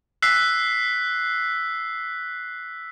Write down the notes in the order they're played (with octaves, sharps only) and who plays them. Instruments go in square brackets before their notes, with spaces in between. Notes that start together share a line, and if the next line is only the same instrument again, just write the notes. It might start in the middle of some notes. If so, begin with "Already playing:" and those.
[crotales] E6 F#6 B6 C7